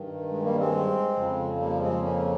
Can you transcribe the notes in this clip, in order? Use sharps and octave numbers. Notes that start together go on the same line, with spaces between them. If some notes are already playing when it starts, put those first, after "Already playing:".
Already playing: G2 D#3
G#3
G3 A#3
G#3 C4
F2 C#3 F3
G3 A#3
G#3 C4
A#3 C#4